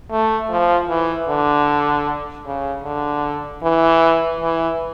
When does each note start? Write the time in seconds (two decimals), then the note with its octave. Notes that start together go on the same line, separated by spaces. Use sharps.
0.11 A3
0.50 F3
0.89 E3
1.28 D3
2.45 C#3
2.84 D3
3.63 E3
4.41 E3